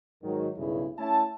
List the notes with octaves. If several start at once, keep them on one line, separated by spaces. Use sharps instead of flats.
G#2 D#3 F#3
B1 G2 C#3 E4
A3 C#4 E4 E5 A5